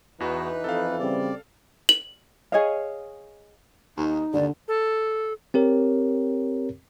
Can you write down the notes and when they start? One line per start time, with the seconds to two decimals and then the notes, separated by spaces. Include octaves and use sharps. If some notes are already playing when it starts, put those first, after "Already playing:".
0.20 E2 E3 D#4 F#4 B4
0.64 F2 A4 F5
0.99 C#3 G3 C4 D5
1.89 F#7
2.52 G#4 C#5 D#5 F5
3.97 D#2 D#4
4.34 D#2 D3 D5
4.68 A4
5.54 C4 G4 A#4 C#5